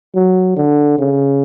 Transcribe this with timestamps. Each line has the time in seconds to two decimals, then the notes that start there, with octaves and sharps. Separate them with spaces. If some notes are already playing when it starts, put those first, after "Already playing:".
0.15 F#3
0.57 D3
0.99 C#3